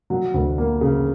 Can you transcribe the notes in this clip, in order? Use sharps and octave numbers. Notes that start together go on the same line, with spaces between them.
F#3
D2
A#3
C#3